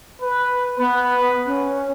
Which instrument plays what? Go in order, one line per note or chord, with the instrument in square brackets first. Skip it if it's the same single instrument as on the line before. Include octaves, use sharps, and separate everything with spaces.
[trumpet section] B4
[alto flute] B3 [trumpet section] B4
[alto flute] C#4